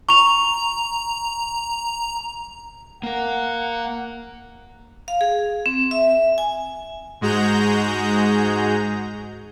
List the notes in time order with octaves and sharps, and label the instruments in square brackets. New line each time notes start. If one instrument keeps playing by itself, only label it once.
[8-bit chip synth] A#5 [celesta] C#6 F7
[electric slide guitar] A#3 A#4 [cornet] F#5
[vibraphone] F5
G#4
C4
E5
G#5
[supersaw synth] G#2 G#3 F#4 G#4 A#5 G6